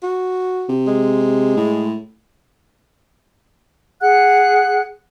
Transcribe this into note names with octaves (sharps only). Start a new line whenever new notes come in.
F#4
C3
G#3
A2
G#4 F#5 F#6